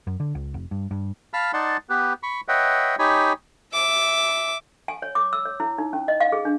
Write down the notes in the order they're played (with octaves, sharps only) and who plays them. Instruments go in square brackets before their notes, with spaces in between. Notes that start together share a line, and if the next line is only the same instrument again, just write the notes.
[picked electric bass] F#2
D3
C#2
F1
G2
G2
[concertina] F5 A5 B5 F6
D#4 D5 F#5 A5 C6
B3 G4 B4
B5 C#6
B4 C#5 D#5 E5 F#5 G5
D#4 G4 C#5 G#5 B5
[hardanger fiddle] E5 D6
[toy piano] G#5
C#5
D6
E6
C#5
E4
D#4
C#4
D#5
F5
G#4
D4